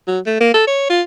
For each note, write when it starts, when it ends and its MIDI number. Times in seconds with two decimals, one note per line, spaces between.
0.08 0.19 54
0.26 0.36 57
0.41 0.49 58
0.54 0.64 69
0.67 0.85 73
0.90 1.02 65